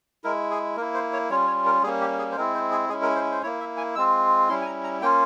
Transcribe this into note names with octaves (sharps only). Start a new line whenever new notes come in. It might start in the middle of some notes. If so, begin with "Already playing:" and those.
G#3 E4 A#4
G#4
A#3 E4 A#4
C5
C#5
G3 C#4 F4 C#5
C#5
A#4
G3 A#3 C#4 G#4
G4
G#4
C5
G#3 C4 E4 A#4
C5
G#4
G#3 C#4 E4 G#4
A#4
C5
C5
A#3 E4 C#5
E5
G#5
G#3 C4 F4 E6
G3 C#4 E4 C6
G#5
A#5
A#5
A#3 C#4 F4 G5